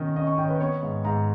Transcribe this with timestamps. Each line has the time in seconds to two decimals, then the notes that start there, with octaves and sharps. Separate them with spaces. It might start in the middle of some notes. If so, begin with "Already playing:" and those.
Already playing: B2 D#3 C#4 D#5
0.16 C#4 D#5
0.27 C#6
0.38 D#3 G5
0.44 C#5
0.49 B4
0.60 B3 C#5
0.82 G#2
1.04 G#2 A#5